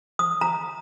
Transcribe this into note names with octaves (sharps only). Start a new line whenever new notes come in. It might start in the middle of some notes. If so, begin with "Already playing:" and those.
D#6
A#5